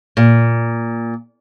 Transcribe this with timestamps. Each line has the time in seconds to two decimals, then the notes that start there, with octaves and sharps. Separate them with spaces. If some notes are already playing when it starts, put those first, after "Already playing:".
0.17 A#2